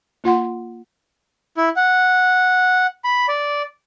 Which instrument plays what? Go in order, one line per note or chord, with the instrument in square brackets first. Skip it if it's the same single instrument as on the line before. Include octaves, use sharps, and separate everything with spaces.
[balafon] A#3 F4 F#5 C6
[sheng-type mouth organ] E4
F#5
B5
D5